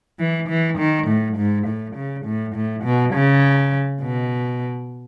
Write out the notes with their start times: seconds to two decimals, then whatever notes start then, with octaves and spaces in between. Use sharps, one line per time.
0.19 E3
0.49 E3
0.78 D#3
1.07 A2
1.37 G#2
1.67 A2
1.96 C#3
2.26 A2
2.55 A2
2.84 B2
3.14 C#3
4.02 B2